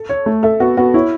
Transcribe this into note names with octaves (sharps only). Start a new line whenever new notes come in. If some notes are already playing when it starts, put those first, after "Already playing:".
Already playing: A4
C#5
A3
A4 E5
B3 F#4
B3 F#4
E4 C#5